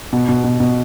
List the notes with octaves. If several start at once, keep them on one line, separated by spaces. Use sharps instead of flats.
B2
B2
B2
B2